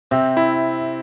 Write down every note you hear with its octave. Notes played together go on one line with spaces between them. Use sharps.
C3 C4
E4